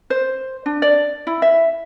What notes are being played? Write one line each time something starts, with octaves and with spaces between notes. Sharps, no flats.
C5
D4
D5
E4
E5